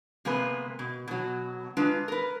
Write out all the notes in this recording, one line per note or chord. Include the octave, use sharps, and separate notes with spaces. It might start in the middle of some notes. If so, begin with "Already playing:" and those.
C3 G#3 A#3 B3 B4
B2
B2 F#3
G#3 D4 F4 B4
A#4 B4